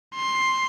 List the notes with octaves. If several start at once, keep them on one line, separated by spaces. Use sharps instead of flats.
C6